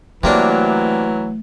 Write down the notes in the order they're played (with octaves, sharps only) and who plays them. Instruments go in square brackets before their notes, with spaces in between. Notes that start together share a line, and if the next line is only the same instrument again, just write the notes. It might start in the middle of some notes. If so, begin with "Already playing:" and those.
[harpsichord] C3 A#3 D4 [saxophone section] E3 F#3 [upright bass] A3